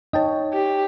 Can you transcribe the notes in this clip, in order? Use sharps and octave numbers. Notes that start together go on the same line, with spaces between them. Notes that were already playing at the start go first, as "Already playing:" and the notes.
D#4 C#5 D#5 G5 A5
G4